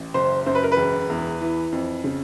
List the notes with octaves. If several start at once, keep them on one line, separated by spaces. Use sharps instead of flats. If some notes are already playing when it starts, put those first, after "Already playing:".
Already playing: A1
F#1 C5
F#2 C5
B4
A#4
B4
E1
E2
E3
F2
C#3